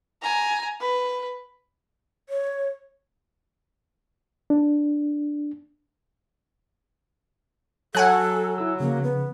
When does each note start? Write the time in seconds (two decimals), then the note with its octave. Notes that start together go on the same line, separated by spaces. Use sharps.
0.22 G#5 A#5
0.81 B4
2.29 C#5
4.50 D4
7.95 F#3 A4 F#5 G#5 F#6
8.58 E4 E6
8.80 C#3 F3 A#3
9.03 B3